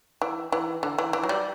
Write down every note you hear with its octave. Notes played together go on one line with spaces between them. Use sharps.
E3
E3
D3
E3
E3
F#3
G3